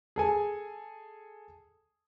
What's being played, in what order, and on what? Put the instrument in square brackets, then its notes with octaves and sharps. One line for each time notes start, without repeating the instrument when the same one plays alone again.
[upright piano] G#4 A4 G#5